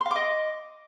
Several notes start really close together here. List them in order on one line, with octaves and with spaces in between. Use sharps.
C6 F5 D6 D#5